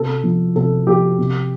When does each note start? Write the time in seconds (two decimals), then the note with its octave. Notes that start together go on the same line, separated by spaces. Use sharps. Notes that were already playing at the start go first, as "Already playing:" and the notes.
Already playing: C3 A4
0.24 F3
0.55 C3 A4
0.87 F3 G4
1.18 C3